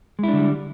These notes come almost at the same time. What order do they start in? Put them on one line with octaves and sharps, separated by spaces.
G#3 E4 D4 D3 G3